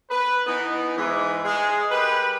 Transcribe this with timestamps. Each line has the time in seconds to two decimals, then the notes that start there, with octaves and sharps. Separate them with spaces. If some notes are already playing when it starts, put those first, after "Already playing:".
0.10 B4
0.47 E3 B3 D#4
0.97 G#2 E3 G#3
1.44 G#3
1.91 G3 A#4 B4